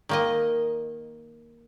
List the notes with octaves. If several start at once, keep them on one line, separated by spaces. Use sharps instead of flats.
D#3 A#3 D#5